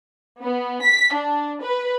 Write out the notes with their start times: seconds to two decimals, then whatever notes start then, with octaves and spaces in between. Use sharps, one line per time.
0.41 B3
0.82 B6
1.14 D4
1.62 B4